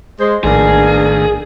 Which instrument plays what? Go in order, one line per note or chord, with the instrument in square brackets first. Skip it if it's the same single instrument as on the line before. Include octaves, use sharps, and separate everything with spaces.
[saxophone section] G#3 C5
[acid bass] A#1 [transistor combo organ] A2 D#3 [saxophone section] A#3 B3 D4 [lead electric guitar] G#4